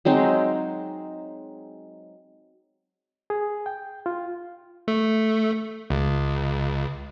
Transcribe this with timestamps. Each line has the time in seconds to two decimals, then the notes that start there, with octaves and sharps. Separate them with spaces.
0.05 F#3 G#3 C4 D#4
3.30 G#4
3.66 G5
4.06 F4
4.88 A3
5.90 C#2